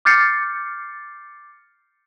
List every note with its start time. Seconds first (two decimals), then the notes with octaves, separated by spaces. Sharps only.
0.05 D6 F6 G6 A6 C7 C#7